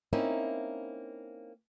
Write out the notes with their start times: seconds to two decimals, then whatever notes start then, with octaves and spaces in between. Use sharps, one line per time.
0.13 A#3 C4 C#4 D#4 E4